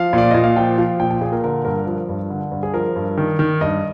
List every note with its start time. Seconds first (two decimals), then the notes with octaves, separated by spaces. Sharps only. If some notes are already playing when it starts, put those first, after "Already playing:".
Already playing: F3 F5
0.13 A#2 D5
0.31 A#2 D#5
0.44 F5
0.56 F3 G5
0.78 F3 F5
1.00 A#2 G5
1.11 G5
1.21 A#2 G#4
1.32 A#4
1.43 D3 A#4
1.65 G2 A#4
1.87 F3 A#4
2.09 G2
2.30 D3
2.52 G2
2.63 G#4
2.74 F3 A#4
2.96 G2
3.18 D#3
3.39 D#3
3.61 G2 D#5